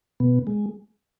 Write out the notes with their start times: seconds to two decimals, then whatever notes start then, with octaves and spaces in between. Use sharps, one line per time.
0.20 B2 B3
0.47 G#3